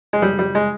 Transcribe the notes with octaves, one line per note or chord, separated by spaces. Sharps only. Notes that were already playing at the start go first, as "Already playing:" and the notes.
G#3
G3
G3
G#3